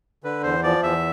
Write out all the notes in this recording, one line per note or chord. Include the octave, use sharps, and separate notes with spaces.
D3 B4
E2 C5
F3 D5
E2 E5